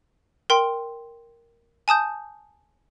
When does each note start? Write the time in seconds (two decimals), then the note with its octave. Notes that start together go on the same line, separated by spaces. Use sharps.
0.50 A#4 G5 C6
1.88 G#5 A5 D#6 G6